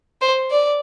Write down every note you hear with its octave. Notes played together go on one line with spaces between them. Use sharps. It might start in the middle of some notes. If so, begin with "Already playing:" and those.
C5
D5